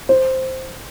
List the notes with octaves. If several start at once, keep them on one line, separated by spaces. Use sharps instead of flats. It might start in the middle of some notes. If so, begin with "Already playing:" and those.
C5